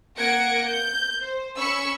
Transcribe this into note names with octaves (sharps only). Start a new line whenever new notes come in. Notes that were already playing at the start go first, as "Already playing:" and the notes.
A#3 F#5 G#6 A#6 C#7 D7
G6
C5
C#4 B5 C#6 E6 C#7